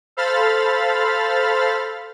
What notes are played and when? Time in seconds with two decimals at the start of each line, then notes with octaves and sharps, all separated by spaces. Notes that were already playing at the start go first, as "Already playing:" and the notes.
0.17 A4 C5 F5 B5 F6 A6